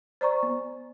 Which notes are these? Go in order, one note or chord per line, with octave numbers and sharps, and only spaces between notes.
C5 D5 A#5 C#6
B3